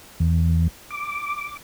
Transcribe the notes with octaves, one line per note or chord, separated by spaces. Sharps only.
E2
D6